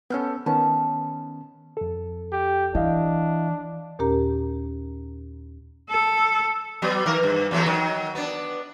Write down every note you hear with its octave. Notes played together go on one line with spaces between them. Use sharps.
B3 C#4 A4 F6 G6
D#3 B3 C#4 A5
F2 A4
G4
E3 D4 E4 D#5 F5
D#2 A#2 C#4 G4 A#4 A#5
A4
F#3 B3
D#3 A#4
G2
E2 F#3 A3
D#3 F#3
B3 D4